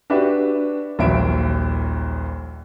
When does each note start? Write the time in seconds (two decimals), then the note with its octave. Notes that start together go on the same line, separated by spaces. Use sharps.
0.10 D4 F#4 G4 B4 E5
0.98 D#1 A#1 D#2 F#3 E5 D7